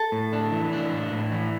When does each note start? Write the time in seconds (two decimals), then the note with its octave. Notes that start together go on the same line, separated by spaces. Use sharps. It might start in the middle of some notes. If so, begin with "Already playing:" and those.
Already playing: A4
0.12 A2
0.33 D4
0.52 E3
0.73 D4
0.92 A2
1.12 A2
1.32 E3